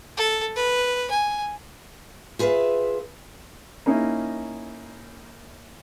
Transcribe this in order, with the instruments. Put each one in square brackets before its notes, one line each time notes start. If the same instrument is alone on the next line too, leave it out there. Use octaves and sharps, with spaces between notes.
[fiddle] A4
B4
G#5
[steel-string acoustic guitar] F4 G#4 B4 D#5 E5
[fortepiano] A#3 C#4 D#4 E4